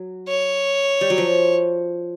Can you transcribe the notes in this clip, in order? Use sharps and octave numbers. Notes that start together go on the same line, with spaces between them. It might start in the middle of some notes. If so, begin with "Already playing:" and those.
Already playing: F#3
C#5
G3
F#3
F3